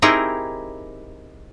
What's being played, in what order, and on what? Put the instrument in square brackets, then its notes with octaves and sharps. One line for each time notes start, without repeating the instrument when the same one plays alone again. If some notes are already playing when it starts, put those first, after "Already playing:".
[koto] C4 D#4 E4 G4 G#4 A#4